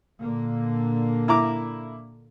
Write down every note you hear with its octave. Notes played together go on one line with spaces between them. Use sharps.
A#2 D3 A#3
E4 A#5 D6